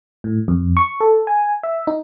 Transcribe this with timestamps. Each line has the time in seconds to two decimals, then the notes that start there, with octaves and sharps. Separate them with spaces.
0.24 A2
0.48 F2
0.77 C#6
1.00 A4
1.27 G#5
1.63 E5
1.87 D#4